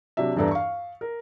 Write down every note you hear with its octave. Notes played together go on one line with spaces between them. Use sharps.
C3 F#3 D4 E5
E2 G2 E3 D4 A4 A#5
F5 C#6
A#4